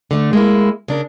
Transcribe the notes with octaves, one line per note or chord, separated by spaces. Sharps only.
D3 A3
G#3 A#3 E4
C#3 D4 A#4